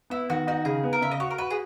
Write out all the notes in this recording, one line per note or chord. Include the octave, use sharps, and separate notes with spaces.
B3 E4
D#3 F#4
D#4 F#4
C#3 G#4
B3
A#4
C#3 E5
D#5
F#4 C#5
A#4
F#4 B4
G#4